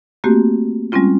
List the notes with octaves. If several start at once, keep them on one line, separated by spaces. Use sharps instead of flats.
A3 A#3 C4 F#4 G4
G3 G#3 C4 C#4 F4